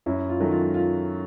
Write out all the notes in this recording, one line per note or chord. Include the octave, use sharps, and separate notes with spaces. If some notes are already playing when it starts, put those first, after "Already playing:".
F#2 E4
F4
D#3 F#3 A3
F4
F4